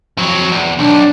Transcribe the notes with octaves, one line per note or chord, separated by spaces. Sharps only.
F2 F#3
E2
B1 D4